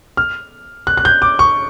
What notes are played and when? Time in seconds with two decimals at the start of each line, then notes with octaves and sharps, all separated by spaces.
0.17 F6
0.87 F#6
0.97 F#6
1.05 G6
1.22 D6
1.39 C#6